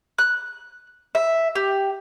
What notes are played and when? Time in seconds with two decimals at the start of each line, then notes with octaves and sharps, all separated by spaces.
0.18 F#6
1.15 E5
1.55 G4